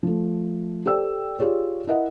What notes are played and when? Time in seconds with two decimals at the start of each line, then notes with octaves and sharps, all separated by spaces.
0.03 F3 A3
0.85 G4 A4 C5 D5 G5 E6
1.39 F4 G4 G#4 C#5 D5
1.87 E4 A#4 D#5 E5 F#5